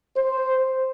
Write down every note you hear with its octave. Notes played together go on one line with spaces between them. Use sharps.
C5